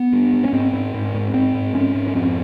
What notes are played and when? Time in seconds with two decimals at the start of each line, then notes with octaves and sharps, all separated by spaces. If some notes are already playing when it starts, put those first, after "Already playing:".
Already playing: B3
0.13 G2
0.33 G2
0.45 C#4
0.53 G#2 C4
0.73 G#2
0.94 G#2
1.14 G#2
1.34 G#2 C4
1.54 G#2
1.74 G#2 C#4
1.95 G#2
2.08 C#4
2.14 F2 C4